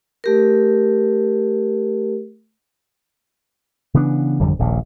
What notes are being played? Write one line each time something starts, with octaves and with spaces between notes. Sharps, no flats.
A3 G4 A#4
C#3 E3 B3 D4
G#1 F2 D3 G3
D#1 A#1 A#2